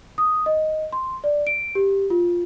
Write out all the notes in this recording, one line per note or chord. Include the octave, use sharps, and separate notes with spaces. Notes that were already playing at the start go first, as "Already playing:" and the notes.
D#6
D#5
C6
D5
D7
G4
F4